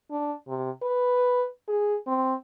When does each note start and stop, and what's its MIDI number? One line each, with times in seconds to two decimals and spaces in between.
0.11 0.34 62
0.48 0.71 48
0.83 1.44 71
1.68 1.97 68
2.07 2.35 60